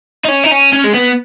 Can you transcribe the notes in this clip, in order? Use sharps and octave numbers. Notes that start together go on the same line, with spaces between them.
D#4
C#4
D#4
C#4
C#4
G#3
B3